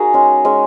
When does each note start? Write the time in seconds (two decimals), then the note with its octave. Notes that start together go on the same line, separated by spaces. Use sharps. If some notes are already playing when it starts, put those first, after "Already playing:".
Already playing: D#4 F#4 G#4 A#4
0.14 G#3 C#4
0.45 G#3 C#4